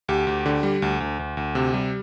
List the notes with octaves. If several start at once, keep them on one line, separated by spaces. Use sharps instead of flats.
D2 G4
D2
D3
G3
D2
D2
D2
D2
C3
G3